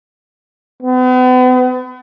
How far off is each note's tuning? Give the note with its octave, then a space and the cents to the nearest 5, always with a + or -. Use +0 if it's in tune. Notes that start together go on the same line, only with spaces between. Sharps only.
B3 +40